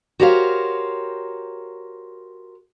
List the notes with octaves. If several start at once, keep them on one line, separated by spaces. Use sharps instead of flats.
F#4 G4 A#4 C5 C#5 F5